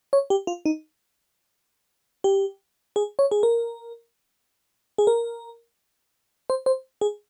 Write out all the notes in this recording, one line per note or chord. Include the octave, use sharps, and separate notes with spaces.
C#5
G4
F4
D#4
G4
G#4
C#5
G#4
A#4
G#4
A#4
C5
C5
G#4